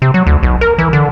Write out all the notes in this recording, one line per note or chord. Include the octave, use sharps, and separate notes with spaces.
C3
F#3
D2
B1
A#4
E3
D3